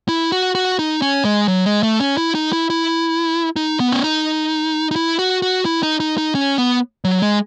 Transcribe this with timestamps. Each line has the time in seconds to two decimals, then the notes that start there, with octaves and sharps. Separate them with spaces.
0.08 E4
0.32 F#4
0.55 F#4
0.79 D#4
1.02 C#4
1.25 G#3
1.48 F#3
1.66 G#3
1.83 A3
2.00 C#4
2.17 E4
2.35 D#4
2.53 E4
2.70 E4
3.56 D#4
3.80 B3
3.92 C#4
4.04 D#4
4.91 D#4
4.96 E4
5.19 F#4
5.42 F#4
5.65 E4
5.83 D#4
6.00 D#4
6.18 D#4
6.35 C#4
6.58 B3
7.04 F#3
7.22 G#3